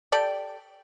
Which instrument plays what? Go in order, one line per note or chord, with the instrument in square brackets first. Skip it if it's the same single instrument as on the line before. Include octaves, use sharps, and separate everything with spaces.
[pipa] G4 A4 D5 G5